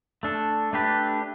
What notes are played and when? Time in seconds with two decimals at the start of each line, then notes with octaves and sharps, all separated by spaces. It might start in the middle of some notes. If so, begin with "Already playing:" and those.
0.23 A3 D4 A4
0.73 A3 D4 G4 B4